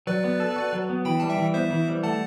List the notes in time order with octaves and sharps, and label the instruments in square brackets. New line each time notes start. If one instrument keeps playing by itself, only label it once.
[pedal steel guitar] F#3 [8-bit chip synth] B4 D5
[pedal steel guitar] B3
A4
F#4
F#3
B3
[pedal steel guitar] E3 [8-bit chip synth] G5 B5
[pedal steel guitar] G3 [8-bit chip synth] A5
[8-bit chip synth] E5 G5
[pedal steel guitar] E3
[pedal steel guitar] B3 [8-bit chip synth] C5 E5
[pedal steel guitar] E3
G3
[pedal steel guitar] A3 [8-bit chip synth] F#5 A5